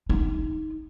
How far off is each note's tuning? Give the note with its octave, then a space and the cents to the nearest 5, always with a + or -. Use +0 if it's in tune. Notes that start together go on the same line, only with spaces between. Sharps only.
D#4 +10